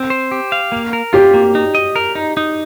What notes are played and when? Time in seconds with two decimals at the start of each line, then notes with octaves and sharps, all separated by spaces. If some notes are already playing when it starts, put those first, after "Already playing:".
Already playing: C4
0.10 C5
0.32 G4
0.52 F5
0.72 A#3
0.93 A#4
1.13 F4 G4
1.34 A#3
1.55 D#4
1.75 D#5
1.96 A#4
2.15 D#4
2.37 D#4